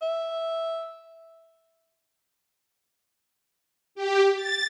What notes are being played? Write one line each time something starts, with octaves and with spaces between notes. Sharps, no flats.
E5
G4
A6